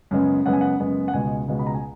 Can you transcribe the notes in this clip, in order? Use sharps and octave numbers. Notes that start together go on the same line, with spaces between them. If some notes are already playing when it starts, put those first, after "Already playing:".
F#2 C#3 G#3 B3
F#2 C#3 G#3 B3 F#5
G#5
F#5
F#2 C#3 G#3 B3
F#5
C#2 B2 G#3 G#5
C#2 B2 G#3
B5
A#5
G#5